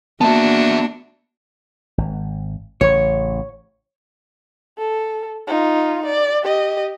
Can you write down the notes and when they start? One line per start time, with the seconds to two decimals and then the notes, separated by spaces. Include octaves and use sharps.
0.21 A#3 B3 D4 F#4 E5 A5
1.98 G#1
2.81 A1 C#3 C#5
4.79 A4
5.48 D#4 F4
6.06 D5
6.44 G4 D#5